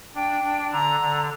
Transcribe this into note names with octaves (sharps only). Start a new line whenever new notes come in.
D4 G5
D4
D3 A#5
D3